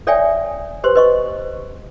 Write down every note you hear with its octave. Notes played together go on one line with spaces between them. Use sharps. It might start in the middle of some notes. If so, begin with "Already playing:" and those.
A4 C#5 D5 E5 G5 G#5
G4 B4 C5 C6
B4 D#5 C#6